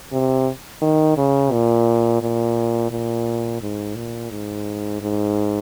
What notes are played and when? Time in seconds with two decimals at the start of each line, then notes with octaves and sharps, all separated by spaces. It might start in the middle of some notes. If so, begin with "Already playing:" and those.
0.12 C3
0.82 D#3
1.17 C#3
1.52 A#2
2.22 A#2
2.91 A#2
3.62 G#2
3.96 A#2
4.31 G#2
5.01 G#2